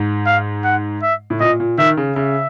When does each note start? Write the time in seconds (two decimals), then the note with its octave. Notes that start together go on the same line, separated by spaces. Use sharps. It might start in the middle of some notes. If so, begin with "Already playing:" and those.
Already playing: G#2
0.27 F5
0.64 F#5
1.03 E5
1.30 A2
1.40 A#2 D#5
1.60 A#2
1.78 D#3 E5
1.97 C#3
2.16 C#3 E5